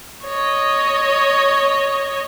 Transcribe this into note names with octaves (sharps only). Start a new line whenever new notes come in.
C#5 D#5